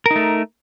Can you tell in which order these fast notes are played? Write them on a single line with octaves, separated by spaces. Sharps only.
A#4 D#4 A3